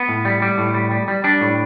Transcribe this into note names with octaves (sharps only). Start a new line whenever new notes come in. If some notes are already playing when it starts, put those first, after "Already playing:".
Already playing: B3
A2
G3
G3
A2
G3
G3
G3
G3 D4
A2